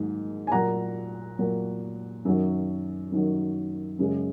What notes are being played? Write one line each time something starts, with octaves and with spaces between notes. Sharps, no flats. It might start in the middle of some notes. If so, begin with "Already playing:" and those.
Already playing: G#2 D#3 F#3 A#3
G#5
A#2 F#3 A#3 F#5 A#5
A#2 F#3 A#3
F#2 D#3 F#3
F#2 D#3 F#3
F#2 C#3 G#3